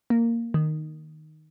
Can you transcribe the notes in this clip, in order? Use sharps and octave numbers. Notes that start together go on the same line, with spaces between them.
A#3
D#3